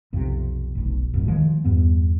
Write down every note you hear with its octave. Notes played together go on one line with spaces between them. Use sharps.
B1 F2 C3
F1 B1
D1 C2 F#2
D#3 F3 G#3
E2 G2 B3